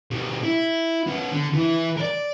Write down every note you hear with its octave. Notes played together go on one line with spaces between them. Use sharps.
B2 G3
E4
B3 C#4
D3
E3 E4
A#4 D5